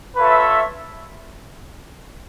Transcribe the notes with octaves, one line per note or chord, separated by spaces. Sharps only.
F4 A4 B4 C#5 E5